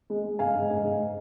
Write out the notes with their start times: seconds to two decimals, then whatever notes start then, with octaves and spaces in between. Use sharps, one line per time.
0.10 G#3
0.24 G#3
0.39 G#2 F5 G#5
0.55 G#2
0.70 G#2
0.84 G#2